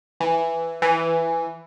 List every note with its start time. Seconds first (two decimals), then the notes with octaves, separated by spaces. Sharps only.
0.20 E3
0.82 E3